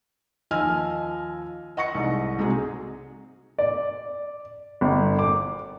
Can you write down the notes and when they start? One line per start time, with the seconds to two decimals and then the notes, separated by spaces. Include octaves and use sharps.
0.51 D#2 F3 D#5 G#5 E6 F6
1.77 D#5 F#5 C#6 A#6 C#7
1.95 C2 G#2
2.39 C3 G#3 D#4 F#4 G#4
3.59 D5
4.81 G1
5.19 D6